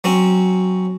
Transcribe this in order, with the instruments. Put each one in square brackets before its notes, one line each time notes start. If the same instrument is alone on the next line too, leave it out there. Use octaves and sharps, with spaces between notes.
[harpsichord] F#3 C4 C#4